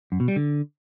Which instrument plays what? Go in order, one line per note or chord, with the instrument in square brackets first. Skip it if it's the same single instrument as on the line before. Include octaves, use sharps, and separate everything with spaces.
[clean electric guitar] F#2
B2
G3
D3